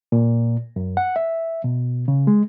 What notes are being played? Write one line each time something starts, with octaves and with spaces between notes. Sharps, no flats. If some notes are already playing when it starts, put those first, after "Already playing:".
A#2
F#2
F#5
E5
B2
C#3
G#3